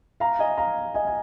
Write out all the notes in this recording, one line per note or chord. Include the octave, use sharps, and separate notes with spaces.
F5 A#5
D#5 G#5
F5 A#5
D#5 G#5
G#5